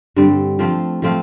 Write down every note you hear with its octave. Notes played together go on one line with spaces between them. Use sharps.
G2 D3 G3 C4
F3 A3 C4 F4
F3 A3 C4 F4